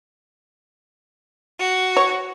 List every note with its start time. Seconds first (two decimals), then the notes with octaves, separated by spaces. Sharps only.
1.59 F#4
1.96 C#5